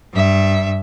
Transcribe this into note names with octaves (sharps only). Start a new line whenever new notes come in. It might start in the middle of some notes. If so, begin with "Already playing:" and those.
G2 E5